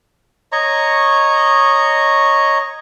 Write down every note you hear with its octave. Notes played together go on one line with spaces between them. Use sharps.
C#5 D#5 A#5 C#6